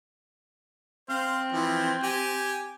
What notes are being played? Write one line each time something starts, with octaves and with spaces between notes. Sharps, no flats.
C4 C5 F5
E3 F3
G4 G5 G#5